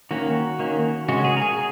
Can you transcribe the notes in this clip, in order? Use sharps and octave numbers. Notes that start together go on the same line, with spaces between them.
D#3 A#3 C#4 F#4
D#3 A#3 C#4
C#3 G#3 C#4 F#4
G#4
A#4
G#4